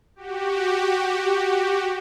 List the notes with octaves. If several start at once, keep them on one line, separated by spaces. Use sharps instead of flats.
F#4 G4